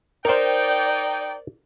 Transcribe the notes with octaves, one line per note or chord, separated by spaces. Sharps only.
D#4 A#4 C5 D5 D#5 G5